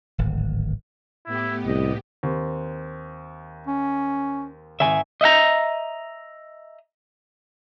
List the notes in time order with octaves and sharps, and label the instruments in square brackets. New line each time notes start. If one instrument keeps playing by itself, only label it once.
[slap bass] D1 G#1
[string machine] A2 B3 G4 [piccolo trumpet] E4
[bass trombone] C2 [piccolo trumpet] D#5
[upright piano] D#2 C4
[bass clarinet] C#4
[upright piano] G#1 [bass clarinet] G#2 [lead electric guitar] E5 G#5
[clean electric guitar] D#5 E5 F#5 A#5